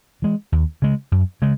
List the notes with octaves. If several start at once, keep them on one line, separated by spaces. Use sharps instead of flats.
E3 G#3
D#2
C#3 G#3
F#2
C#3 G#3